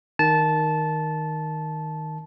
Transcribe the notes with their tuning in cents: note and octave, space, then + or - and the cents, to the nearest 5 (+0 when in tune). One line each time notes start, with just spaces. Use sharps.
D#3 +0 A5 -15